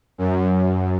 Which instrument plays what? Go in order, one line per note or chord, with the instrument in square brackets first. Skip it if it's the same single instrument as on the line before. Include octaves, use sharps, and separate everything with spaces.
[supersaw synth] F#2